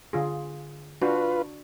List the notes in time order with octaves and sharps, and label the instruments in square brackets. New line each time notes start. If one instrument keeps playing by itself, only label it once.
[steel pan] D3 F4 G#4
[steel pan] D4 F#4 [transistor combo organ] F4 B4